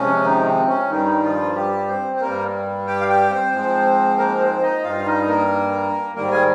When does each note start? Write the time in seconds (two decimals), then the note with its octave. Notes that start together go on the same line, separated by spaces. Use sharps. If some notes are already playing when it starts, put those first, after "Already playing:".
Already playing: C3 F3 G#3 C#4
0.24 D#3 D#4
0.46 C4
0.68 C#4
0.90 G2 D#3 G3 D#4
1.23 F3 F4
1.55 G3 G4
1.88 C4 C5
2.16 C5
2.21 G2 G3 A#3 A#4
2.87 G4 G5
3.01 F5
3.09 G4 G5
3.31 C4 C5
3.53 G#2 F3 G#3
4.18 A#3 A#4
4.39 C4 C5
4.62 D#4 D#5
4.83 G2 G3 F4 F5
5.06 D#4 D#5
5.27 A#3 A#4
6.15 G#2 D#3 G3 A#3 A#4
6.31 G#4 G#5